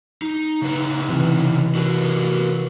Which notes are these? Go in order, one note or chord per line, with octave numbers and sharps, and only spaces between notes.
D#4
C#3 D#4 B4
C3 E3
F#4 A#4 B4